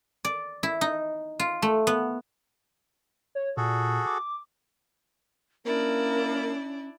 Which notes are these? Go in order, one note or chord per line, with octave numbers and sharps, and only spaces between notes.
D5
E4
D#4
F4
A3
B3
C#5
A#2 F#4 G#4 A4
D6
A#3 C#4 D4 E4 A#4 D5